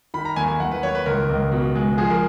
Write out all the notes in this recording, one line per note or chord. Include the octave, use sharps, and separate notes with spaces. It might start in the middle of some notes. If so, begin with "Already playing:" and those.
D#3 B5
A#5
D#2 G#5
G#5
D#2 F#5
B4
D#2 C#5
B4
C#2 A#4
C#2
B2
G#3
F3 G#4
A#4